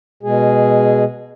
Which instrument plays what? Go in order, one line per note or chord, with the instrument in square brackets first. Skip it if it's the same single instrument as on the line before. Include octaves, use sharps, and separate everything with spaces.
[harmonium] B2 G#3 G#4